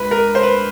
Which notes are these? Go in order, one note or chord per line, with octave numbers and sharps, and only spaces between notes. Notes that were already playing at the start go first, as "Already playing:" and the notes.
Already playing: C#2 B4
A#4
C5
B4